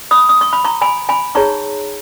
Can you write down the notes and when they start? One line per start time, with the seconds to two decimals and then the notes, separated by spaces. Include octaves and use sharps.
0.11 B5 D#6
0.29 D#6
0.41 C#6
0.53 B5
0.65 A#5 C#6
0.82 G#5 B5
1.09 G#5 B5
1.35 D#4 G#4 C#5 A#5 C#6